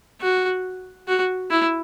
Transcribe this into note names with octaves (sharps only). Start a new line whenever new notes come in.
F#4
F#4
E4